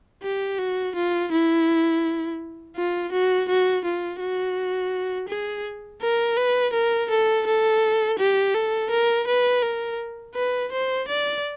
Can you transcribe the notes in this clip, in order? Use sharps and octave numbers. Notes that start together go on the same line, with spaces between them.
G4
F#4
F4
E4
F4
F#4
F#4
F4
F#4
G#4
A#4
B4
A#4
A4
A4
G4
A4
A#4
B4
A#4
B4
C5
D5